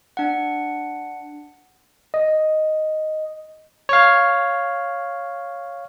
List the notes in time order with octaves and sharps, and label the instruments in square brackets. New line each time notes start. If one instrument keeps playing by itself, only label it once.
[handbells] D4 F#5
[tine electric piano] D#5
C#5 F5